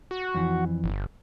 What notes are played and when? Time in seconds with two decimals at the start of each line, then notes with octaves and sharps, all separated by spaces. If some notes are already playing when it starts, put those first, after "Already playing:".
0.11 F#4
0.35 F2 E3
0.84 G1